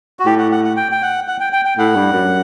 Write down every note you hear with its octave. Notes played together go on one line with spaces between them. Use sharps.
F#4
A2 G4
F#5
F#5
F#5
G5
G5
F#5
F#5
G5
G5
G5
A2 F#5
G2
F#2